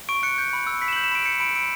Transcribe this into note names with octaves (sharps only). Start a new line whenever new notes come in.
C#6 D7
F#6 C#7
G6
B5
E6
B5 B6
E7
G6 F#7
E7
B5 D7
G6 C#7
B5 D7
E6 D7